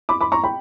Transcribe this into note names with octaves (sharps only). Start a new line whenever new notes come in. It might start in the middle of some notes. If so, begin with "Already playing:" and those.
B5 D6
B5 D6
A#5 C#6
G5 B5